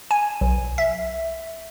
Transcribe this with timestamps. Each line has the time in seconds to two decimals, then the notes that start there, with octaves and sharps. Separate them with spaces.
0.11 G#5
0.41 B1
0.78 E5